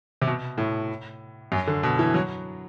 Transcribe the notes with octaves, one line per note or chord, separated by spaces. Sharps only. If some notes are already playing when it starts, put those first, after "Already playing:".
C3
B2
A2
F#2
D3
B2
E3
F#3